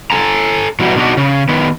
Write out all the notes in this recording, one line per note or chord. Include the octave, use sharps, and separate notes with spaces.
A4 G#5 A#5
B2 E3 F#3 G3
B2 D4 D#4 F#4
C#3
D#3 B3